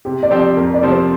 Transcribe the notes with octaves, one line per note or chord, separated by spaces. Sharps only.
C3 G4
D5
F3 C4 G4 C5
D5
F2 A#4
D5
C3 F3 C4
C5